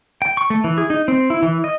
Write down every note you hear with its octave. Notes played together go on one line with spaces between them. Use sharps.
G5
C#6
A3
E3
G#4
D#4
C4
E4
E3
D#5